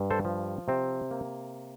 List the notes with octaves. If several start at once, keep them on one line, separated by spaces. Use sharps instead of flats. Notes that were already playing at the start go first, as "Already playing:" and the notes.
Already playing: G2
A4 C5
F3
C3 C4
A#3